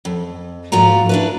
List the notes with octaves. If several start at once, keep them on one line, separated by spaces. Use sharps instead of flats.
F2
G#2 F3 F4 F#4 A#5
D4 E4 B4